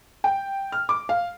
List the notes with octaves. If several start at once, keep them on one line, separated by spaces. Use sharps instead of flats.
G5
F6
D6
F5